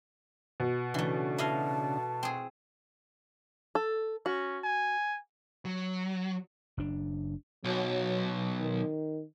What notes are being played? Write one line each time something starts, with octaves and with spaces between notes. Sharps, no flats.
B2
C#3 E3 A3 D4
E4 D#5 F5 A5
C4 G#4
A4
C#4 F#4
G#5
F#3
F#1 D4
B1 F#3
D#3